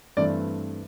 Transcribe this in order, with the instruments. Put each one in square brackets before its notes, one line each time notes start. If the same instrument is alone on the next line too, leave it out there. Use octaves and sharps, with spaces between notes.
[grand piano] G2 E3 A3 C4 D5